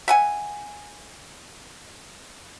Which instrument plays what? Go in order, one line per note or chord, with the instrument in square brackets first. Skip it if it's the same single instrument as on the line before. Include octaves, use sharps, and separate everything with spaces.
[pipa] E5 F#5 G#5